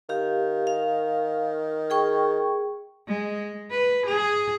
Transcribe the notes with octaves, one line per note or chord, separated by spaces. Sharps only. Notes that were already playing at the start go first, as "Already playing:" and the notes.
D#3 G4 F5
F5
G#4 G5 C#6
G#3
B4
G#4